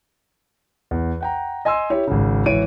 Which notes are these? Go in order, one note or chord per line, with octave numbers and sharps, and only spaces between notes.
E2
F#5 G5 A#5
D#5 G#5 C6 E6
E4 G4 C#5
G#1 C#3
G#1 E3 C#5 D7 D#7